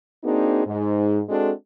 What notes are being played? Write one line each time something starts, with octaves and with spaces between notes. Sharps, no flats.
A#3 C4 D4 D#4 F#4 G#4
G#2
G#3 C4 D4 F#4 A4